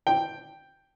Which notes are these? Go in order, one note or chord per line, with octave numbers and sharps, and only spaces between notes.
G5